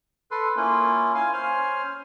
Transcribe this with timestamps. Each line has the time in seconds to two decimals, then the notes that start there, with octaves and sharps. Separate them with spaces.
0.31 A4 B4 C6
0.57 A#3 C#4 E4 F4
1.15 F5 G#5 C6
1.33 C#4 C5 G#5 F6